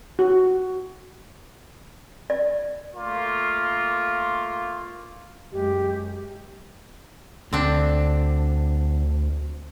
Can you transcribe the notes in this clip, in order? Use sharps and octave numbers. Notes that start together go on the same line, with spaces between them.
F#4
D5
A3 A#3 F4
F#2 G#3 G4
D2 D3 C4 D4